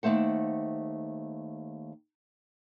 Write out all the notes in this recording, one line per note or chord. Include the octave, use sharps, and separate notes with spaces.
D#2 G#3 A3 C5 F#5